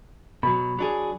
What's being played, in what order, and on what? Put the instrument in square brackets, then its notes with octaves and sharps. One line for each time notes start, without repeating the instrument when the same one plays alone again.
[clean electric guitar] B2 F#3 [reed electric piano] B5
[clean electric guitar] F#3 D4 G#4